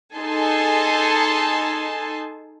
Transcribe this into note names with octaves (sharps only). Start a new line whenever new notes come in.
D#4 G#4 A4 G#5 A5 C6